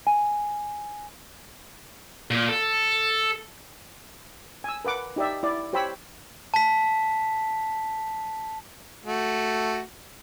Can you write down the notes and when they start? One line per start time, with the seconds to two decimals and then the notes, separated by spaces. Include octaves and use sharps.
0.07 G#5
2.31 A#2
2.49 A4
4.64 G#5 E6
4.85 A#4 B4 F#5 D6
5.16 D#4 G4 D5 E5
5.43 E4 D5
5.73 G4 C5 C#5 G5 B5 E6
6.54 A5 B6
9.06 A3 F#4